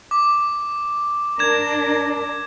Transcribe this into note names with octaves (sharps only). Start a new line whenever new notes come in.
D6
D4 A#4 G#6 E7